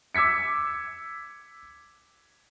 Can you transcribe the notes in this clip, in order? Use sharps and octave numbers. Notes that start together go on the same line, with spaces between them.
D6 E6 G#6 B6 C#7